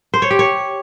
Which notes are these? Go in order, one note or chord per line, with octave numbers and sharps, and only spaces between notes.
C5
C#5
G4
C#5